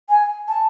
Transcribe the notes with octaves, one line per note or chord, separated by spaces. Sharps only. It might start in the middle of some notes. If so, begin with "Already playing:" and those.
G#5
A5